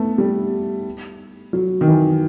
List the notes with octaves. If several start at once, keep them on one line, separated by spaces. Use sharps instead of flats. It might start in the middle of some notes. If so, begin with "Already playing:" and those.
Already playing: A3 B3
G3
F#3
D#3
E3